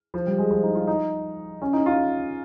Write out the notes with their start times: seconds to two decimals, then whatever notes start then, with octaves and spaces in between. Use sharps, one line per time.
0.14 F3
0.27 G3
0.38 G#3
0.50 F3
0.63 D#4
0.75 F4
0.87 D#4
1.62 C#4
1.73 D#4
1.86 F4